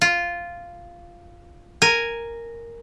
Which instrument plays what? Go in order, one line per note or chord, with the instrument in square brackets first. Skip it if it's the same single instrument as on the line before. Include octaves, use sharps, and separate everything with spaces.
[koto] F4
A#4 G#5